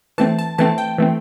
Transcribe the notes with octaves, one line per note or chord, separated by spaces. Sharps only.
E3 A3 C4 A5
A5
E3 A3 C4 A5
G5
E3 A3 C4